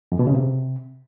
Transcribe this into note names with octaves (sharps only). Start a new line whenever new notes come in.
F2
B2
C#3
C3